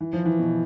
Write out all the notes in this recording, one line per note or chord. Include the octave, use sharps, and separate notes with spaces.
E3
F3
E3
B2